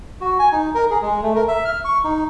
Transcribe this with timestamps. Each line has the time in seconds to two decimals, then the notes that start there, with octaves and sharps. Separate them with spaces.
0.21 F#4
0.39 G#5
0.52 D#4
0.75 A#4
0.90 G#4
1.02 G#3
1.23 A3
1.35 A#4
1.48 E5
1.65 F6
1.85 C#6
2.04 D#4